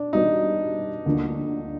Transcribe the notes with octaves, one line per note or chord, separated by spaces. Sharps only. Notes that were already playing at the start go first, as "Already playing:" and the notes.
Already playing: B2 D4
B2 G3 B3 D#4
D2 D3 F3 A#3 D4